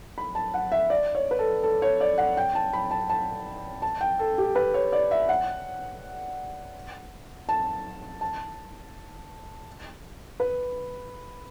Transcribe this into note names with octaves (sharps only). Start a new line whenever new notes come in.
B5
A5
F#5
E5
D5
C#5
B4
A4
A4
C#5
D5
F#5
G5
A5
B5
A5
A5
A5
G5
A4
G4
B4
C#5
D5
E5
F#5
A5
A5
B4